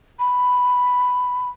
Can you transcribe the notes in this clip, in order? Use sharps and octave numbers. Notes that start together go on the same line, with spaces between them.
B5